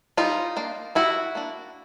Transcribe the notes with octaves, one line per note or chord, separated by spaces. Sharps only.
G3 D#4 F4
A#3 D4
G3 E4 F#4
A#3 D4